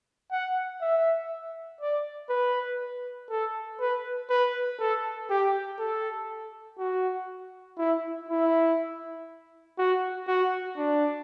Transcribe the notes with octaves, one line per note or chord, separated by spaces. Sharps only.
F#5
E5
D5
B4
A4
B4
B4
A4
G4
A4
F#4
E4
E4
F#4
F#4
D4